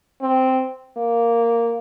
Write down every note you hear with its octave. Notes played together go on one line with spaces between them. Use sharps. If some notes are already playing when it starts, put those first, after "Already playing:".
C4
A#3